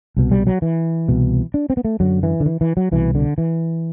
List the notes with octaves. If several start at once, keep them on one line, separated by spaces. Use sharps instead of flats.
C2 B2
G3
F#3
E3
C2 B2
D4
C4
B3
A3
F#2 D3 F#3
E3
D3
E3
E3
F#3
C2 B2 E3
D3
E3